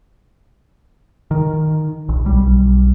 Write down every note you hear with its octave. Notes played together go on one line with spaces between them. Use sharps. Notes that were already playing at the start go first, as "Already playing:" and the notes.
D#3
A#1
B1 G3